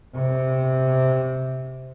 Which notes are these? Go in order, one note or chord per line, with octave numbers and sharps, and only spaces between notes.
C3